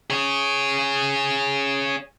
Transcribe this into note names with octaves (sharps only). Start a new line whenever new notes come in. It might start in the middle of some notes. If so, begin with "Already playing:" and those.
G#4 C#5